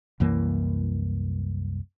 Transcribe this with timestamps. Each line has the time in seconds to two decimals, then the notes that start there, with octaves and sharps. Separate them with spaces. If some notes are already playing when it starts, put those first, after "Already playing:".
0.20 C2 F#2 E3 A#3